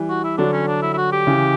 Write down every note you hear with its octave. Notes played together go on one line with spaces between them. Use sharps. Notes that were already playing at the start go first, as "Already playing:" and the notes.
Already playing: E3 G3
F#4
E4
D3 F#3 D4
C#4
D4
E4
E4
F#4
G4
C#3 E3